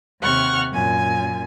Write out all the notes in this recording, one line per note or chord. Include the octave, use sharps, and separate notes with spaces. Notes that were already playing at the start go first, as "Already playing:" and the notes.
D#2 C3 F#5 C#6 F6
F#2 A#2 G#5